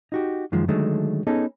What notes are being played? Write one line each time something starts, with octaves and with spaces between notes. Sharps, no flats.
D#4 F#4 G4
F#2 D#3 F3 G#3
D3 D#3 F#3 G#3 A3
B3 C#4 D#4 G#4 A4